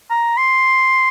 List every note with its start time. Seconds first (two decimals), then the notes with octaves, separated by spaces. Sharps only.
0.10 A#5
0.37 C6